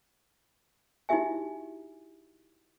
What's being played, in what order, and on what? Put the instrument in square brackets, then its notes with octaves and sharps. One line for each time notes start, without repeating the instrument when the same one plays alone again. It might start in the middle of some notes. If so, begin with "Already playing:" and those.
[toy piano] D#4 E4 F#4 G4 E5 G#5